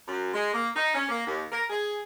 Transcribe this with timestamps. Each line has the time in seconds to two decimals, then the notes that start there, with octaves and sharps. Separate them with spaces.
0.08 F#2
0.33 G#3
0.54 A#3
0.76 D#4
0.95 C#4
1.09 A#3
1.26 D#2
1.52 A#4
1.69 G#4